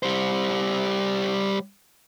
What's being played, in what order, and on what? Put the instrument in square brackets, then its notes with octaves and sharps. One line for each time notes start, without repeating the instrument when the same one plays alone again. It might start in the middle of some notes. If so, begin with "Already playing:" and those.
[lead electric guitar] G3 C5